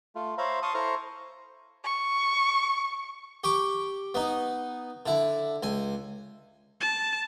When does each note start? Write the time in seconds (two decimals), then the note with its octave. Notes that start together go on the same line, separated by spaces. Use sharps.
0.15 A3 F4
0.38 C5 C#5 E5 F5 A#5 B5
0.62 F5 A5 C6 C#6 D#6
0.74 E4 A4 C5 A#5 C#6 F6
1.84 C#6
3.44 G4 C#6 D6
4.14 B3 D#4
5.06 D3 E4
5.63 C#2 G#5
6.81 A5